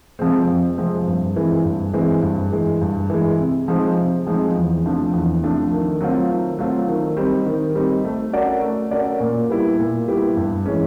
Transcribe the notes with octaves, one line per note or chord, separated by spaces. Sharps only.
C3 F3 G#3 C4
F2
C3 F3 G#3 C4
G2
E3 G#3 C4
G2
E3 G#3 C4
G2
E3 G#3
G2
E3 G#3
C3
F3 G#3 C4 D#4
C3
F3 G#3 C4 D#4
E2
C3 F3 A3 D4
E2
C3 F3 A3 D4
D#3
F#3 A3 C4 F4
D#3
F#3 A3 C4 F4
D#3
G3 C4 D#4
D#3
G3 C4 D#4
A3
C#4 F#4 A#4 D5
A3
C#4 F#4 A#4 D5
A#2
G3 B3 E4 G4
A#2
G3 B3 E4 G4
G2
E3 G#3 C#4